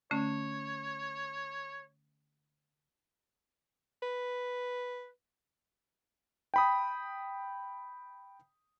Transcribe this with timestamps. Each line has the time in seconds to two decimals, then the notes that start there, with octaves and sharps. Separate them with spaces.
0.11 D3 A3 C#4 C#5
4.02 B4
6.54 G5 B5 D#6